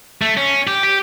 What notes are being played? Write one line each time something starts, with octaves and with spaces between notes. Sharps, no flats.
A3
C#4
G4
G4